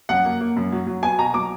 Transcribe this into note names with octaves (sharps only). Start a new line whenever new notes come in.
F#2 F#5
A#3
A#3
F#2
F#3
F#3
B3 G#5
B2 A#5
F#3 D6